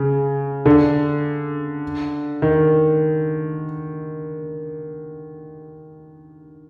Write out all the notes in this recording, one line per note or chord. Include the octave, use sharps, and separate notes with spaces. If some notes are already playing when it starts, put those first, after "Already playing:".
Already playing: C#3
D3
D#3